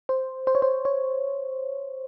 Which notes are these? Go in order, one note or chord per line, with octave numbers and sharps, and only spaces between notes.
C5
C5
C#5
C5
C#5